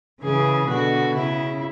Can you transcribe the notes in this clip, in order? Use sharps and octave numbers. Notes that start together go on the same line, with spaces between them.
C#3 E3 G#4
B2 D3 F#4
C#3 E4